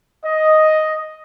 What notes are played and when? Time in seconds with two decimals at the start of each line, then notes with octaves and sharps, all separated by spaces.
0.25 D#5